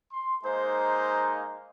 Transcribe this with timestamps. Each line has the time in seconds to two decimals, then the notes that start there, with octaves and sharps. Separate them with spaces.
0.13 C6
0.45 G#3 A#3 D#4 C5